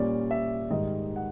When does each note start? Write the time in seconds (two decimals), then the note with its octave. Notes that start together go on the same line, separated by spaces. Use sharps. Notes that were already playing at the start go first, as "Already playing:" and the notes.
Already playing: A#2 G3 A#3 C#4 D5
0.31 E5
0.70 G#2 D#3 G3 D#5
1.16 F#5